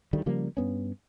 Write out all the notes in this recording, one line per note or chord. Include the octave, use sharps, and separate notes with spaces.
D2 D#3 G3 A3
C#3 F3 G3 A#3
G2 B3 C#4